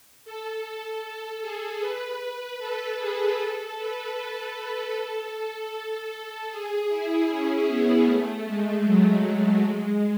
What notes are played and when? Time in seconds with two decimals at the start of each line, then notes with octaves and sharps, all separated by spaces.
0.25 A4
1.41 G#4
1.81 B4
2.59 A4
2.98 G#4
3.37 A4
3.77 B4
4.16 A4
6.50 G#4
6.89 E4
7.28 C#4
7.67 B3
8.06 A3
8.46 G#3
8.85 F#3
9.24 A3
9.63 G#3